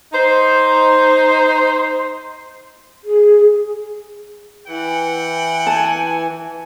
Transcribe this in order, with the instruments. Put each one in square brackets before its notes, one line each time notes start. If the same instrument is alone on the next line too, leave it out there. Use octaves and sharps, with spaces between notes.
[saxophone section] D#4 C5
[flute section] G#4
[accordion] E3 [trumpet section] F#5 G5
[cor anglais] G#5 [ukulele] A5